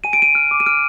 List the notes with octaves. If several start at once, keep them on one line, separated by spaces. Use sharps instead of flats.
G#5 D#7
D7
G#5 D#7
F6
D6
D#7
F6 D7